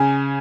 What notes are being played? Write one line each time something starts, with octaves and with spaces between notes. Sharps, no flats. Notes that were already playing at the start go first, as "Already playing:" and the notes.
Already playing: C#3 G#5